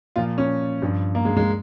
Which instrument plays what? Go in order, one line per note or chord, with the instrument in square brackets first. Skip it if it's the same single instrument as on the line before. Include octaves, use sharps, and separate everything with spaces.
[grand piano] A#2 F3 F4
C#4
G2 F3
A#3
G#3
G#3